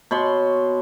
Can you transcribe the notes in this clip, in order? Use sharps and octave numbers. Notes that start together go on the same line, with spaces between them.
B2 C#5 B5 C6